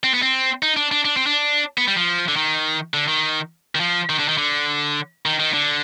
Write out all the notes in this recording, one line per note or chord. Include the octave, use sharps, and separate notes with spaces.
C4
B3
C4
D#4
D4
D4
D4
C4
D4
B3
G3
F3
D3
D#3
D3
D#3
D#3
F3
D#3
D3
D#3
D3
D#3
D#3
D3